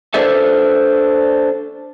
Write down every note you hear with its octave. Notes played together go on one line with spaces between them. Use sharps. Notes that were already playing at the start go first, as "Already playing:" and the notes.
D4 A4 B4 C5 D5 E5